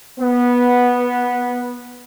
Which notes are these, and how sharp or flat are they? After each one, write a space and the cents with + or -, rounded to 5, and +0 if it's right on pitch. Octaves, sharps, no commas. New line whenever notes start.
B3 -10